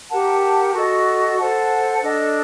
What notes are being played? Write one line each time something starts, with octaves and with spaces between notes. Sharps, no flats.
G4 A#4 F#5 A5
F#4 A4 D#5
A4 C5 F#5 A5
D4 A4 D#5